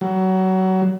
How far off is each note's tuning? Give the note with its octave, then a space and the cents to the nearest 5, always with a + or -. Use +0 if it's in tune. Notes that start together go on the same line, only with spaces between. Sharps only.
F#3 +25